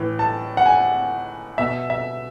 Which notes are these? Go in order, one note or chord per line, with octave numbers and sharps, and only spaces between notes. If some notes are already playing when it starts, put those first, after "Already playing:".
Already playing: A2 E3
A5
F#5
G#5
B2 E5
E5